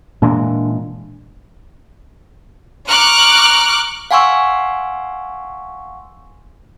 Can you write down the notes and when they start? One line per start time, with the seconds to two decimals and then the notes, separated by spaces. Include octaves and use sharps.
0.22 A#2 E3 G#3 D4
2.89 A#5 C#6 D6 F6 F#6
4.11 F5 F#5 G#5 C6 C#6 E6